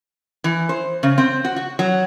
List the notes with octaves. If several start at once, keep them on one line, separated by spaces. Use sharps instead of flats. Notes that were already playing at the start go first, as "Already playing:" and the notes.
E3
C5
C#3
C4
F#4
F#4
F#3